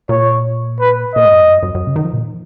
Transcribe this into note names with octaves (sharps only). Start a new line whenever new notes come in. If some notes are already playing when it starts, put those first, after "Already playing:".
A#2 C#5
B4
A#2 D#5
G#2
F#2
F2
F#2
F#2
F#2
C#3
D#3
F3
A#2